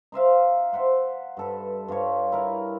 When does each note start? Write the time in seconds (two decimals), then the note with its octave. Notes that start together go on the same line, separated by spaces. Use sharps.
0.12 D#4 C5 E5 F5
0.73 C5 E5 F#5 C6
1.37 G2 A4 B4
1.88 G2 F4 G4 C#5
2.32 E4 A#4